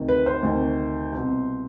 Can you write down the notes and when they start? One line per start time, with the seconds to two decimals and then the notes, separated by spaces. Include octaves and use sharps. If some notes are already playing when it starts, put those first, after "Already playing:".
Already playing: D2 C3 D#3
0.08 B4
0.26 C5
0.43 D2 C3 D#3
1.12 C2 B2